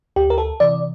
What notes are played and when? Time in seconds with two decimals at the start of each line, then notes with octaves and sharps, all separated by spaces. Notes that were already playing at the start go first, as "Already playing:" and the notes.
0.16 D2 G4
0.30 A#4
0.38 A4
0.60 C3 E3 D5